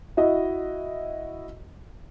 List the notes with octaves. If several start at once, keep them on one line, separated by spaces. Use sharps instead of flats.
E4 F#4 D#5